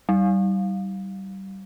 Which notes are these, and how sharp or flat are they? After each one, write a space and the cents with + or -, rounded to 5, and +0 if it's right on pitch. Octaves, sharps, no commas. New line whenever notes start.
G3 -25